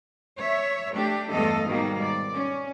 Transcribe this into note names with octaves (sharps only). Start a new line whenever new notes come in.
C#5 E5
A3 D4 G4
E2 G2 A3 A4 D#5 F5
G#2 B2 D#3 G3 A#3
D5
C#4